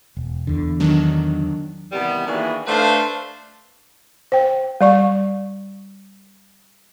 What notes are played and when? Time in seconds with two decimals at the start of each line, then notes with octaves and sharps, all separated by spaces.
0.17 E1
0.47 E2 D3
0.80 D#3 F#3 D4
1.92 C3 D#3 E3 G3 B3
2.27 D#3 E3 A#3 D4 F#4 G#4
2.67 A3 D4 A4 B4 C5 F5
4.32 C5 G5
4.81 G3 D5 C#6